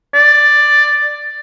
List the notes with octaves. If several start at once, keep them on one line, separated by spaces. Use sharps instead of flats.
D5